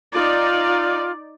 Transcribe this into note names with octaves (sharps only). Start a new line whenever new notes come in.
D#4 F4 D5